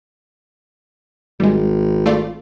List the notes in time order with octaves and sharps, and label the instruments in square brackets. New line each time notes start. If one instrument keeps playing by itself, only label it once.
[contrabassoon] G#1 [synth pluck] G3 G#3
[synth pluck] A3 F4 D5